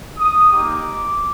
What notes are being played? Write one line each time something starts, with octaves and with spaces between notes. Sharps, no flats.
D#6
A#3 D#4 G4 D6